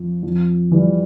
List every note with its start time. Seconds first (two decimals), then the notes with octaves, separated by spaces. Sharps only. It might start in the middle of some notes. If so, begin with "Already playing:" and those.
Already playing: F2
0.23 F2
0.71 E3 G3